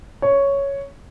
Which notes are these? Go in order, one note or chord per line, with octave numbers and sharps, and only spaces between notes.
C#5